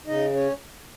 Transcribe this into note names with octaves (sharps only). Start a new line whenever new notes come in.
C#3 D#4 D#5
C#4 C#5